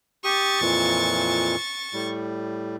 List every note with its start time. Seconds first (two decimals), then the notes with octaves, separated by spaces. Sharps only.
0.24 G4 C#6 D#6 A6
0.61 F2 A#2 E3
1.94 A2 G3